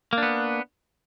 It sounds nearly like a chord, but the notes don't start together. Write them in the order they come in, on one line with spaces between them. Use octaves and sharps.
A#3 D4 B3